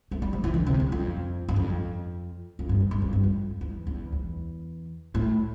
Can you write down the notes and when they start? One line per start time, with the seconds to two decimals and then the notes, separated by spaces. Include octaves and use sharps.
0.11 A3
0.22 G3
0.33 F3
0.44 E3
0.54 D3
0.66 C3
0.80 E2
0.92 F2
1.49 G2
1.56 F2
2.59 F2
2.69 G2
2.80 F2
2.91 G2
3.02 F2
3.13 G2
3.23 F2
3.61 E2
3.87 E2
4.12 E2
5.15 A2